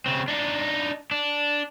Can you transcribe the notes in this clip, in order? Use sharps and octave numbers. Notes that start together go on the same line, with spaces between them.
C#3 C4
D4 D#4
D4